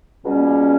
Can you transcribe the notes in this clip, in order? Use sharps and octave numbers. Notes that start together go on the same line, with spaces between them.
C#2 B2 G3 A#3 C#4